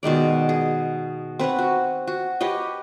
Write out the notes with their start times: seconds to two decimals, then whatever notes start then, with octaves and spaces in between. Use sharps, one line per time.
0.03 B2 D#3 G#3 D5
0.49 G#4
1.39 C4 B4 C#5 F#5
1.59 F#4
2.08 F#4
2.41 G4 B4 C#5 D#5